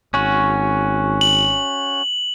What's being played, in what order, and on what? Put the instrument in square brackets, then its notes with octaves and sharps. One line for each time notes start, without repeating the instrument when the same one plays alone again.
[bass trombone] G#1 [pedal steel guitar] C#4 F#4
[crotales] F#7